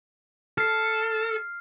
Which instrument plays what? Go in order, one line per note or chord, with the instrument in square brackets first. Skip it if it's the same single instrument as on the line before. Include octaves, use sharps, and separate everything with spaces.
[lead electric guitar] A4 [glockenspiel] F6 C7